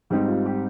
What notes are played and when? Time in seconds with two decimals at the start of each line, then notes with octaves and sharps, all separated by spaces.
0.10 G#2 G3 C4 D#4 G4
0.28 F4
0.46 G4